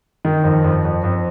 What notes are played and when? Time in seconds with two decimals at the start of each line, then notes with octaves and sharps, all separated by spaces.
0.25 D#3
0.44 F2
0.64 F2
0.85 F2
1.04 F2